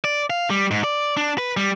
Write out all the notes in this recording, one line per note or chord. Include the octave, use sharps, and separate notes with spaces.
D5
F5
G3
G#2
D5
D4
B4
G3